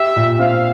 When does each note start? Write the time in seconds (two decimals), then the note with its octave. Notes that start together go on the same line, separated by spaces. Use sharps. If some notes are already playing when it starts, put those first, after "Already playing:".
Already playing: G4 E5
0.16 A#2
0.39 C4 F5